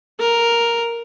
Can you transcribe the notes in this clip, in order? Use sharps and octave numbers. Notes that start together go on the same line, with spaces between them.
A#4